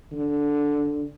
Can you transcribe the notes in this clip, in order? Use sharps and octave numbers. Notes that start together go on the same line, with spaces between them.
D3